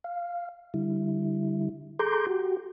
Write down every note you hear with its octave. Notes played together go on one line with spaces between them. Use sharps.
F5
D3 G3 E4
G#4 A4 A#5 C6 D6 G6
F#4 G4